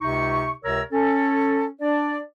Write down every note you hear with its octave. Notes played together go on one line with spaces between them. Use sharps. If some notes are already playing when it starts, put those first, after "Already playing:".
C#2 C3 D#4 C#6
C#2 C3 A#4 C#5 A#5 E6
C#4 A4
D4 D5